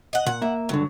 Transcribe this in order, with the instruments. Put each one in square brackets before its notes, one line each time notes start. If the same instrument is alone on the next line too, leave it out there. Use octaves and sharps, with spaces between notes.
[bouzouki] D#5 F#5
[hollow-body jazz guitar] A#2 [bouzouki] F#5
[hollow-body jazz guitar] A#3 E5
[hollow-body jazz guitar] C#2 G2 D3 [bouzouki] F#3